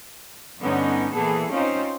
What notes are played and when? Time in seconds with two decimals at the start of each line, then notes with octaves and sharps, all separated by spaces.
0.59 G2 D3 B3 C#4 D#4
1.14 A#2 E3 B3 G#4 A4
1.51 C4 C#4 D#4 F4 C5